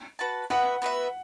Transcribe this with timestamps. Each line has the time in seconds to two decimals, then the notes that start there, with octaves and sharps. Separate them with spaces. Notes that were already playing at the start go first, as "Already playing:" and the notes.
0.19 F#4 B4 F#5 A5
0.50 B3 F#4 B4 E5 F#5
0.82 B3 F#4 B4 E5